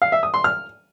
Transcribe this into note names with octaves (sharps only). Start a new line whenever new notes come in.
F5
E5
D#6
C6
F6